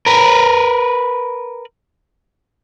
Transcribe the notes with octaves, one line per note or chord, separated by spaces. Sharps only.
A#4 B4